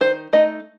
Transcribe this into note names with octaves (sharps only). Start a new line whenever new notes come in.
D#3 C5
A3 D#4 D#5